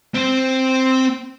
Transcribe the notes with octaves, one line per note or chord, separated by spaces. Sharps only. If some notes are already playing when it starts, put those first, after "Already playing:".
C4 C5